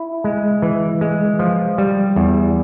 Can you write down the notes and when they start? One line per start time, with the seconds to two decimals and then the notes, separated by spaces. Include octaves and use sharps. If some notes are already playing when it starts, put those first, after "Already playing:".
Already playing: E4
0.24 G#3
0.62 E3
1.01 G#3
1.39 F3
1.78 G3
2.16 E2